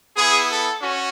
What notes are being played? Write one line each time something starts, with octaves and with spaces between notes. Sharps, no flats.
B3 E4 G#4
A4
C#4 F#4